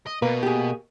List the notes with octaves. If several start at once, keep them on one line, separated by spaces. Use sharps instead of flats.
D#5
B2 A#3 B4
G4 G#4